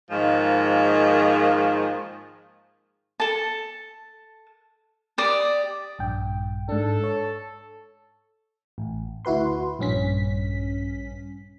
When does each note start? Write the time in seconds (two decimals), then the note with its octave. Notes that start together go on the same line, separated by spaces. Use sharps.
0.11 G#2 D#3 F3 G#3 A#3
3.20 A4 A5
5.18 G4 D5 D#6
5.98 A#1 G2 G5
6.69 G#2 D4 A4
7.03 C#5
8.78 A1
9.25 D2 E4 F#4 B4 C6
9.79 A#1 G2 C#4 B6